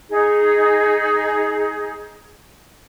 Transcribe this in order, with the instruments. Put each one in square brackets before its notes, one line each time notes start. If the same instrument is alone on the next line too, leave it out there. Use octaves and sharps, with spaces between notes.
[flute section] D#4 G#4